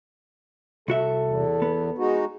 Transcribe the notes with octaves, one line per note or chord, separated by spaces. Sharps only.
C2 F#4 A4 E5
E2
B3
G#3 D#4 F#4